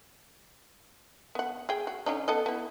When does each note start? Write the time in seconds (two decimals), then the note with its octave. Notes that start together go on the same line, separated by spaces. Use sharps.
1.35 B3 F#5
1.69 G#4 G5
1.87 F#4
2.06 D3 C#4 D#4
2.28 B3 A4 D#5
2.46 B3 E4